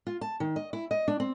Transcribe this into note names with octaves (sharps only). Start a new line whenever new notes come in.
F4
A5
D#3
D#5
E4
D#5
D4
C4